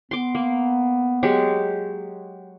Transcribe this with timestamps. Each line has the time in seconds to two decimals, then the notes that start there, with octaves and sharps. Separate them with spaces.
0.11 B3 C6 D6
0.35 A#3
1.23 F#3 G#3 G4